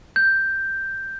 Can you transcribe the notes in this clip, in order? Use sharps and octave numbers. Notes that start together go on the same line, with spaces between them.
G6